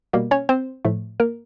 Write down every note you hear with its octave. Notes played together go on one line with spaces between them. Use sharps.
B2 G3 A#3
C#4 C#5
C4 C5
A2 F3 A3
A#3 A#4